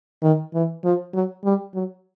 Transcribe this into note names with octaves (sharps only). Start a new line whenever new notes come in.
D#3
E3
F3
F#3
G3
F#3